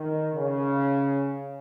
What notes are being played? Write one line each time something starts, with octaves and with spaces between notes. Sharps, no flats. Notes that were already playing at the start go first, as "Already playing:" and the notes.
Already playing: D#3
C#3